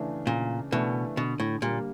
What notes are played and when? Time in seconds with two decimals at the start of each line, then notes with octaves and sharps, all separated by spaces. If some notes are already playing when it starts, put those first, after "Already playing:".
Already playing: C#3 E3 A3 D4
0.27 A#2 C#3
0.72 B2 E3 A3 D4
1.17 B2 D3
1.40 A2
1.62 A#2 G3 A#3